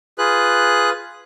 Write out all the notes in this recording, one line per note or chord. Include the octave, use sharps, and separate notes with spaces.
F4 G#4 B4 F#6